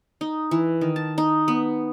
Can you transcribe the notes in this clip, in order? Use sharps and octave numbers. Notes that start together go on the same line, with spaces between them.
D#4
E3
D#3
A5
D#4
B3